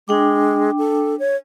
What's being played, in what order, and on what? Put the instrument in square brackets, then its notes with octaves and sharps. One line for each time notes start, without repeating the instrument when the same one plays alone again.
[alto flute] G#3 [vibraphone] D4 G5 D6
[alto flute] A4
C#5